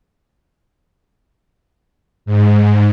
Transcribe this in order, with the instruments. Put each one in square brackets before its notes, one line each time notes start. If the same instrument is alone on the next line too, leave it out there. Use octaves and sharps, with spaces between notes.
[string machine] G#2